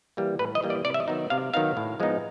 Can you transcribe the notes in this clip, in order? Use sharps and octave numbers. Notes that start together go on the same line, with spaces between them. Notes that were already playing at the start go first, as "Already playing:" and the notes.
E3 G3 A#3
A2 B4
D#5
E3 G3 A#3
D5
C3 D5
E5
D#5
D#3 F#3 B3 D#4
C3 F5
D#3 F#3 B3 D#4 F5
A2
F3 G#3 B3 D#4